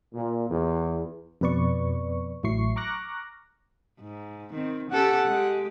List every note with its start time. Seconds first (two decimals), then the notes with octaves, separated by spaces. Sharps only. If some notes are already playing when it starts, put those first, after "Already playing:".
0.14 A#2
0.50 E2
1.41 F2 B2 B4 D5 C#6
2.43 A1 A2 F#3 E4 C#6 C7
2.76 A#5 C#6 D6 F6 F#6 A#6
4.00 G#2
4.53 D#3 C4
4.90 C#4 G4 A4 F#5
5.27 G#3 G4